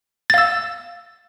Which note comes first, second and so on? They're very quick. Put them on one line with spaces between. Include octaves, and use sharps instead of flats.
A6 F5 E6